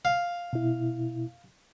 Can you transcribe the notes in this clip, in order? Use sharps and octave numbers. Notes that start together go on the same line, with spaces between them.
F5
B2 E4